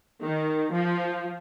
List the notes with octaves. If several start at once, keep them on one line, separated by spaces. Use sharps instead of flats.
D#3
F3